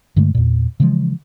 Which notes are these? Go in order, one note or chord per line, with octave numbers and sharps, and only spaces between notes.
G2 D3 G#3 A3
E2 A#2
C#3 E3 F3 G#3